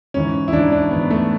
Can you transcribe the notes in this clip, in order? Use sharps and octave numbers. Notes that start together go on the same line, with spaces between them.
G#2 E3 C#4
E4
G#2 E3 D4
D4
G#2 E3 B3
A3